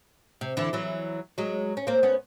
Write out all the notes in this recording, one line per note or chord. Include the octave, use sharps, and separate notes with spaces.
C3
D3 E3
E3 F#3
F#3 G#3
C#4
A#3 C4
B3 C#4